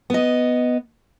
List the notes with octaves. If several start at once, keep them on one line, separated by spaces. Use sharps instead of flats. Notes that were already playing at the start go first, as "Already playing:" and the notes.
B3 D#5